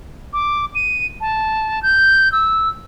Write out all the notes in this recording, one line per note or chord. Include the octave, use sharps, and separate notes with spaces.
D6
D#7
A5
G6
E6